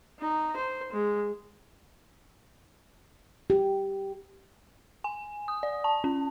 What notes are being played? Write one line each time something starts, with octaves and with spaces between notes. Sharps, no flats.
D#4
C5
G#3
G4
G#5
D#6
D5
A5
C#4